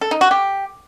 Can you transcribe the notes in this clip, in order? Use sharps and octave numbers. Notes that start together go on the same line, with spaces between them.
A4
D#4
F#4
G4